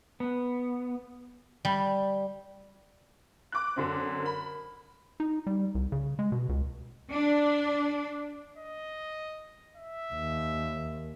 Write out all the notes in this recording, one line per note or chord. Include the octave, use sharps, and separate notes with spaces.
B3
G3
D6 F#6
F#2 D3 C4
A#4 B5
D#4
G3
C2
C#3
G#3
B2
C#2
D4
D#5
E5
D#2